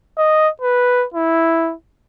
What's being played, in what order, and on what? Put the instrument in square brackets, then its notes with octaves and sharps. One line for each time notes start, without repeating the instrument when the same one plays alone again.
[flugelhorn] D#5
B4
E4